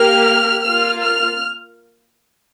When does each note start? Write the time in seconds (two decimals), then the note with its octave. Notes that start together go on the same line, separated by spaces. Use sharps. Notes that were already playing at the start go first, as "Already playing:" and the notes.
Already playing: A#3 G4 F6
0.64 A#3 F6
0.69 F4
1.01 F6